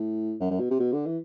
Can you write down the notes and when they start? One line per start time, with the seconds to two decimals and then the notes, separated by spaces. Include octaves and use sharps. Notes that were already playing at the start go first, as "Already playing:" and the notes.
Already playing: A2
0.40 F#2
0.50 F#2
0.60 B2
0.70 C3
0.80 B2
0.93 D3
1.06 E3